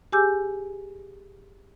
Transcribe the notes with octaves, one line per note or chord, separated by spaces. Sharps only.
G4 G#4 G#5 D6 E6 G6